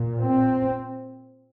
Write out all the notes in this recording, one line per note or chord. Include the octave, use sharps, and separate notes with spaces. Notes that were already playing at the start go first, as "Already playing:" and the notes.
Already playing: A#2
C4